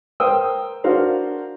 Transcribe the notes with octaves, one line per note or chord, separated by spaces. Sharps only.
A#4 C5 G5 D#6 E6
D4 F#4 A#4 C5 F5